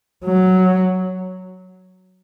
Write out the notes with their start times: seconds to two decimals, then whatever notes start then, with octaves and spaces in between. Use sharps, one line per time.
0.25 F#3